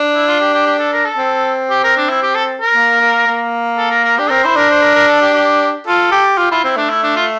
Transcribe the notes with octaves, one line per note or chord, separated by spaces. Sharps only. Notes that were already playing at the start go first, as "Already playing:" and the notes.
Already playing: D4
E4
F4
G4
G4
G4
A4
A#4
A4
C4
G4
A#4
D4
E4
G4
A4
A#4
A#3
A#3
A#3
A4
A#4
A#4
D4 G4
C4 A#4
E4 C5
D4 A#4
C5
A#4
A#4
A4
G4
G4
F4 A4
G4
F4 G4
E4 F4
C4 E4
A3 D4
E4
D4
F4